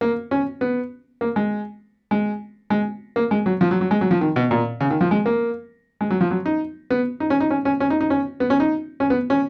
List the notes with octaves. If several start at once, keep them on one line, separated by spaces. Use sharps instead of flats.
A#3
C#4
B3
A#3
G#3
G#3
G#3
A#3
G#3
F#3
F3
F#3
F#3
G#3
F#3
F3
D#3
B2
A#2
C#3
D#3
F3
G#3
A#3
G#3
F#3
F3
F#3
D#4
B3
D#4
C#4
D#4
C#4
C#4
C#4
D#4
D#4
C#4
B3
C#4
D#4
C#4
B3
C#4